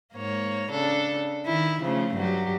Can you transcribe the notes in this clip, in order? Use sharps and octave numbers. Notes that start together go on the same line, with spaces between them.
G#2 A#3 C#5
C#3 D4 A4
D#3 E4
C#3 F3 A3
G2 F#3 G4